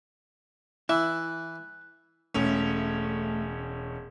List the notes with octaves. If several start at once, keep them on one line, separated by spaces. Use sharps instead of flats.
E3 E4 E5 F#6
E1 A3 C#4